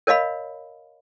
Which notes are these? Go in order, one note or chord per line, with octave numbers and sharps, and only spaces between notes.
A#4 C#5 D#5 F5 B5